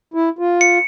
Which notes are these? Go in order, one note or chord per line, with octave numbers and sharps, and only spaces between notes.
E4
F4
C#7